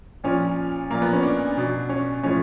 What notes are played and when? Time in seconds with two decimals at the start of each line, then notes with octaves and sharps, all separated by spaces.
0.24 A#2 F3 C#4
0.91 A#2 F3 A#3
1.02 B3
1.13 C#4
1.23 D4
1.57 B2
1.89 C#4
2.23 A2 F3 C#4